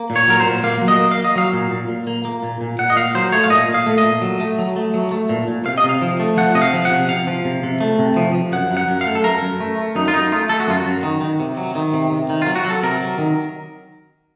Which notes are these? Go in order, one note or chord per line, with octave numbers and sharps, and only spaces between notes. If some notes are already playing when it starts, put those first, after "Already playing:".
Already playing: A#3
A#2
C#5
F#3 A#4
C5
A#2
A#3 F5
F#3
D#5
A#3
F5
A#3
D#5
F#3 F5
A#2
A#2
A#2
A#3
A#3
A#2
A#2
A#2 F#5
D#5
A#2 F5
F#3 C5
A3 C#5
F5
A#2 D#5
A#2
F5
A3
D#5
A#2
F#3
A3
F#3
A3
F#3
A3
A#2
A#2
C3 F5
D#5
C3
F5
F3
A3
F3 F#5
C3 D#5
F5
F3
F#5
C3
C3 F5
F3
C3
C3
A3
C3
F3
F3
F#2 F#5
F#2
F#5
F#2
F5
A3
A4
F#2 A#4
F#2
A3
A3
F#2 D#4
F4
F#2 D#4
A3 F4
A3 A4
F#4
F#2 F4
F#4
F#2
D#3
D#3
C3
F#3
D#3
C3
C3
D#3
F#3 F4
F#4
F#3
A4
C3 A#4
F#3
D#3